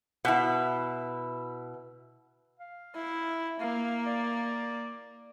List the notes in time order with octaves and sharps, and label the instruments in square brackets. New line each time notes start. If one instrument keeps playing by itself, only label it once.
[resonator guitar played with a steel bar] B2 E4
[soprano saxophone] F5
[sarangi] E4
[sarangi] A#3 [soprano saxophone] F5
[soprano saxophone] D5